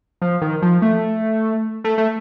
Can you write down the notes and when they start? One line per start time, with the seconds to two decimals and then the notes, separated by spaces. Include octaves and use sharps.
0.22 F3
0.42 D#3
0.62 F3
0.82 A3
1.84 A3
1.98 A3